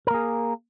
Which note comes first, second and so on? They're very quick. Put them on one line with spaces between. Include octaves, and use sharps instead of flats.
A#4 A#3 G#4